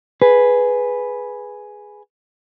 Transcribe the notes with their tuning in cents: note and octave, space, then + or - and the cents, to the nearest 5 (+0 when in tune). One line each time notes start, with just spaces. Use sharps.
G#4 +5 B4 +0